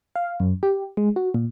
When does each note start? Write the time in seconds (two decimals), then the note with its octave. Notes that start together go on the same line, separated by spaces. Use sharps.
0.16 F5
0.40 F#2
0.63 G4
0.97 G#3
1.16 F#4
1.34 A#2